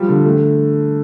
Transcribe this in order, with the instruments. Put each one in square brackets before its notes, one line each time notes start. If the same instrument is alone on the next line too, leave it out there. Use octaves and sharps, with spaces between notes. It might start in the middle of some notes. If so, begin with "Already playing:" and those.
Already playing: [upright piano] F3 G3
D3
A3